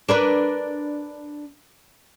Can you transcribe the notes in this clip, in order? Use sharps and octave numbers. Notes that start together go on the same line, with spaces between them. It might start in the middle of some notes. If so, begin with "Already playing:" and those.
D4 A#4 B4